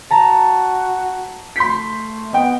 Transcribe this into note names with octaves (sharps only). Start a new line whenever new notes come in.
F#4 A5 A#5
A3 C6 G6 B6
B3 D#5 G5